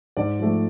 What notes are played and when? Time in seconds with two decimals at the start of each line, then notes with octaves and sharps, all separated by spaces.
0.17 G#2 D5
0.39 F3 A3